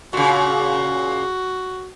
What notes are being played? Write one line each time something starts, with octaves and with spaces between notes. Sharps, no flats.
A#2 C#3 F#4